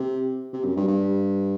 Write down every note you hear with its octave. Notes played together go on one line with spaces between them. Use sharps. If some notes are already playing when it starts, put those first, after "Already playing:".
Already playing: C3
C3
F#2
G2
G2